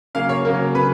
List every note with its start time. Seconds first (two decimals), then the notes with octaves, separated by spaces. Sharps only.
0.15 C#3 F#3 A#3 F5
0.29 C#5
0.45 C#3 F#3 A#3 A#4
0.75 C#3 F#3 B4